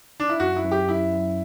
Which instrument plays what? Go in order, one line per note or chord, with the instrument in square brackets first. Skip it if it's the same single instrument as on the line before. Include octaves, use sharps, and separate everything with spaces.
[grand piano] D4
E4
[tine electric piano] F#2 [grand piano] F#4
[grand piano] E4
[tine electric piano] F#2
[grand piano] G4
[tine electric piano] F#2 [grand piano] E4
[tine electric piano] F#2